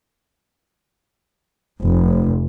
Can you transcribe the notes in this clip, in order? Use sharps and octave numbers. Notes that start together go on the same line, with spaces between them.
F1